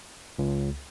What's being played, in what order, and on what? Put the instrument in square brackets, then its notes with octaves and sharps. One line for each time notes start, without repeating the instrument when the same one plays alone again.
[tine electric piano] C#2